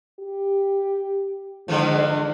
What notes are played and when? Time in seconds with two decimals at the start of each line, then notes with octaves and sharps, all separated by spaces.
0.20 G4
1.68 G#2 D3 E3 F3